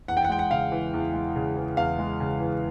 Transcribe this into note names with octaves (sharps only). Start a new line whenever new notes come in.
E2 F#5
G5
F#5
G#3 G5
F#5
C#3 F5
E3
E2
G#3
C#3
E3
E2 F5
G#3
C#3
E3